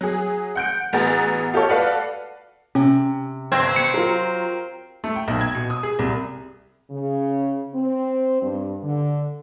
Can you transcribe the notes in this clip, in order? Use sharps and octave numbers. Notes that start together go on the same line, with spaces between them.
F#3 G#4
F#5 G6 D7
A1 B3 F#4 G#4 A#5 A6
F4 G4 A4 C#5
F#4 A4 B4 D5 F5
C3 C#4
G1 C4 G#6
C#7
F#3 F4 A#4
A3
G5
B1
G#6
B2
D#6
G#4
C2
C#3
C4
G2
D3